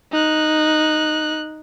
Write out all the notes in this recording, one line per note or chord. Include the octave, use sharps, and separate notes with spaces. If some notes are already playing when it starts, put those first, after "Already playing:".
D#4 F#6